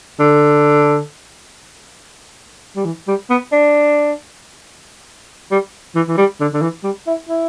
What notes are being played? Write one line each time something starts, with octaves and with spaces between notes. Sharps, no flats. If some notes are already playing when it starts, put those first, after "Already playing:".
D3
G3
E3
G3
B3
D4
G3
E3
E3
G3
D3
D3
E3
G3
E4
E4